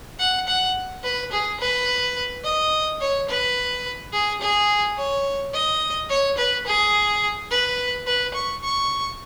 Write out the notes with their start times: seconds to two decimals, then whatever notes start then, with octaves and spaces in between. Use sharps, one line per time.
0.19 F#5
0.48 F#5
1.04 B4
1.32 G#4
1.60 B4
2.44 D#5
3.00 C#5
3.29 B4
4.13 G#4
4.41 G#4
4.97 C#5
5.53 D#5
6.09 C#5
6.38 B4
6.66 G#4
7.50 B4
8.07 B4
8.34 C#6
8.63 C#6